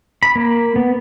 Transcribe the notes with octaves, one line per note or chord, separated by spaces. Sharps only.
B5
A#3
B3